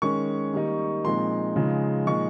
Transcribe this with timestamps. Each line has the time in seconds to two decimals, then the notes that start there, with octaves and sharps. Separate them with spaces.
0.02 D#3 G#3 C#4 C#6
0.53 D#3 G3 A#3 D#4
1.04 A#2 F3 G#3 C4 D#4 C6
1.56 C#3 F3 G#3 D#4
2.07 A#2 F3 G#3 D#4 C#6